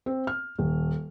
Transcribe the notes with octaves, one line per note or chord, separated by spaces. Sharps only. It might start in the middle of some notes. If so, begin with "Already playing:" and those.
C4
F6
D#1